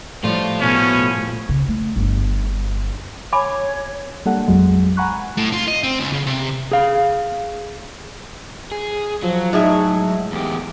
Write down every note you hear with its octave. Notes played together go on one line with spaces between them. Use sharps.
A2 F3 G3 A3 F4
B2 C#4
C#3
A3
G1
C#5 G#5 B5 D6
G3 A#3 D4 A4 F#5
A1 F2 F#3 G#3
F#5 G#5 A#5 B5 C#6 F#6
A2
F4
D#5
C4
C#2
C#3
C3
G#4 F5
G#4
F3 F#3
A2 D#4 G#4 E5
G#3
E2 G4